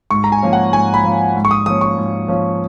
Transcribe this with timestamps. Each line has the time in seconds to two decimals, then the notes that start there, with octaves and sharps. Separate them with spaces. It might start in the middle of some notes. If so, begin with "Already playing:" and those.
0.11 G#2 C#6
0.24 A#5
0.32 G#5
0.43 F3 A#3 C#4
0.53 F#5
0.73 G#2 G#5
0.94 B5
1.04 F3 A#3 C#4
1.36 G#2
1.45 C#6
1.51 D#6
1.66 F3 A#3 C#4 D#6
1.81 C#6
1.97 G#2
2.28 F3 A#3 C#4